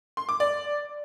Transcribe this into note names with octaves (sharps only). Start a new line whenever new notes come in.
C6
D6
D5